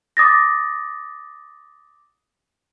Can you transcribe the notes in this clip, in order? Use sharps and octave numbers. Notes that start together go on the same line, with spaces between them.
D6 D#6 A6 A#6